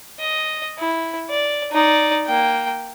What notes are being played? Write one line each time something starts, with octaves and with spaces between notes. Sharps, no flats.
D#5
E4
D5
D#4 D5
A#3 G5